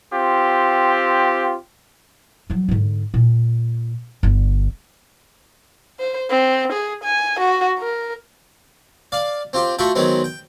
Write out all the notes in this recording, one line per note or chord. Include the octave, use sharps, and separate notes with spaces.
C4 F4 G4
F3 F#3
G#2 D3
A#2
G1 D3
C5
C4
G#4
G#5
F#4
A#4
D5 F5
C4 F4 G4
A3 F4 F#4 E5 G5
D#3 F#3 G#3 B3 C4
G5